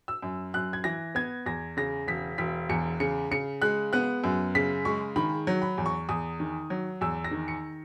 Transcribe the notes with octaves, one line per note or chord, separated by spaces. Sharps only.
E6
F#2
F#2 F#6
G#6
E3 A#6
B3 G#6
E2 A#6
C#3 A#6
E1 B6
E1 B6
E2 C#7
C#3 C#7
C#3 C#7
G#3 F#6
B3 F#6
F#2
C#3 B6
G#3 C#6
D#3 B5
F#3
B5
E2
C#6
E2 D#6
D#3
F#3
E2 E6
A#6
D#3
C#7